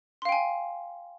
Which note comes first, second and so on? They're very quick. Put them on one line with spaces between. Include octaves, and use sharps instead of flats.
C6 F5 G5 G#5